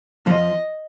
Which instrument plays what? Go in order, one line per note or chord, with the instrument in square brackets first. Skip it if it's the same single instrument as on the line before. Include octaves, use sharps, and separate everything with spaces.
[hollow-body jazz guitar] F2 F3 [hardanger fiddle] D#5